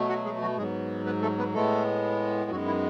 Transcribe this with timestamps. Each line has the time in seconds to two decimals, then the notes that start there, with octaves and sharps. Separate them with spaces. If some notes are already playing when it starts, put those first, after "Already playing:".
Already playing: B2 F#3 A3
0.09 F#4 F#5
0.25 G#3 G#4
0.41 F#3 F#4
0.57 G#2 F#3 G#3 B3 G#4
1.06 B3 B4
1.22 A3 A4
1.38 B3 B4
1.54 A2 G#3 A3 B3 A4
2.51 F#2 D#3 F#3 G#3 B3 F#4
2.67 E4